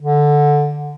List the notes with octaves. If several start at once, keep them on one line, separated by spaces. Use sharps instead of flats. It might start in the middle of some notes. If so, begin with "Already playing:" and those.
D3